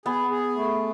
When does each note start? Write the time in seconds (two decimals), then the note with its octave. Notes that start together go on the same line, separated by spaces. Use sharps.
0.06 B3 G#4
0.30 G#4
0.56 A3